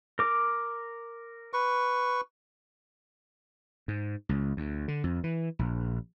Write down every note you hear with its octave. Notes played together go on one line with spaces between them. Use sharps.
A#4 D6
B4 C#6
G#2
C#2
D2
D3
F2
E3
A#1